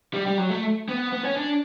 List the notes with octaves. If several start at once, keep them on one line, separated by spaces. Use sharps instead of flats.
G3
G3
F#3
A3
B3
B3
C#4
D4